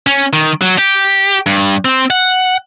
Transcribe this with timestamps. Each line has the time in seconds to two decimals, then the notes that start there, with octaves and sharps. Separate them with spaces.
0.07 C#4
0.33 D#3
0.62 F#3
0.78 G4
1.46 G2
1.85 C4
2.10 F#5